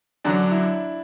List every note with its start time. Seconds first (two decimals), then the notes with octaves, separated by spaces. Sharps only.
0.24 F#2 D3 F#3 D4
0.51 E4